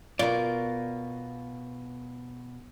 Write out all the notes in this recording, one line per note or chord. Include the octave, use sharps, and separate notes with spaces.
B2 F4 A#4 D5